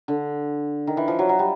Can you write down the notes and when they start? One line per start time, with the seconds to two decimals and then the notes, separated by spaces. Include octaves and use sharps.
0.08 D3
0.87 D#3
0.97 E3
1.08 F3
1.19 F#3
1.29 F#3
1.39 G3